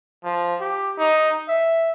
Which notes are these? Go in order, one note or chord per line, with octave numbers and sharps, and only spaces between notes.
F3
G4
D#4
E5